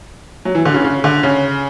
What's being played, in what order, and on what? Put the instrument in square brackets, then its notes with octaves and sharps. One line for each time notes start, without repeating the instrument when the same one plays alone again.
[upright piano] F#3
E3
D3
C#3
C#3
D3
C#3